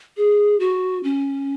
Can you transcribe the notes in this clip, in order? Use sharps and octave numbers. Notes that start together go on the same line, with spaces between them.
G#4
F#4
C#4